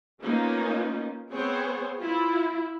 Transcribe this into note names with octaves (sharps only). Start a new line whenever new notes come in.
A#3 B3 C#4 D#4 F4
B3 C4 G#4 C5 C#5
E4 F4